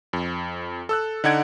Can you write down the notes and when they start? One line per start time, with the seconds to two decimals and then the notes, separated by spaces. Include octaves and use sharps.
0.13 F2
0.89 A4 E6 F#6
1.24 D3 D#4 F#5 G#6 D7